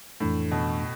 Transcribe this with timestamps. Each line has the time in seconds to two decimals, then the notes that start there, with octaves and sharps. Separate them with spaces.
0.20 F2 A2 E3 A3 D4 A4
0.51 B2